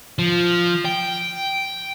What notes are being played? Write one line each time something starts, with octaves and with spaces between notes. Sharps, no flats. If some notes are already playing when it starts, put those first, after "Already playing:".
F3
G5